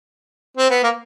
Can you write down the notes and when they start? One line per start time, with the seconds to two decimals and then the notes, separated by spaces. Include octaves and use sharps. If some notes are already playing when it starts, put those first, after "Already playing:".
0.57 C4
0.70 B3
0.84 A#3